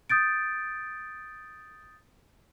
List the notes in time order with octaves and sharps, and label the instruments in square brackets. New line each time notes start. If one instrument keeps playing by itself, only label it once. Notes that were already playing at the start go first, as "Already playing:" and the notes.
[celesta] D#6 G6 A6 D7